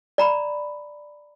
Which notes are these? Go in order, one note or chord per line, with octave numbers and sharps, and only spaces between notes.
D5 A#5 B5